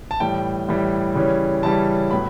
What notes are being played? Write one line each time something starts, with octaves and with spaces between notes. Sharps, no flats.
A5
A2 E3 G3 G5
A2 E3 G3
C#3 E3 G3 C#4
C#3 E3 G3 C#4 A5
A2 F#3 B3 B5